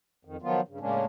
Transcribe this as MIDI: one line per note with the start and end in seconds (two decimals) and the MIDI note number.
0.25 0.37 41
0.25 0.37 51
0.42 0.61 51
0.42 0.61 53
0.42 0.61 54
0.42 0.61 59
0.42 0.61 65
0.68 0.80 43
0.68 0.80 49
0.80 1.05 45
0.80 1.05 49
0.80 1.05 56
0.80 1.05 58
0.80 1.05 61
0.80 1.05 62